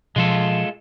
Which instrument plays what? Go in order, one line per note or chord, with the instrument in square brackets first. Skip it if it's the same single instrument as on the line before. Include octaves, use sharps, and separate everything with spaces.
[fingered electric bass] B2 F3 [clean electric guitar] G#3 F4 A4